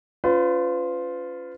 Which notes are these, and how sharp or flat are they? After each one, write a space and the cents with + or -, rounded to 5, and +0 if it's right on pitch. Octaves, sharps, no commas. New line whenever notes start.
C#4 +25 F4 +0 B4 +40